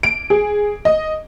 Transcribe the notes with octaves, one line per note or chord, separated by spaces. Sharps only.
D7
G#4
D#5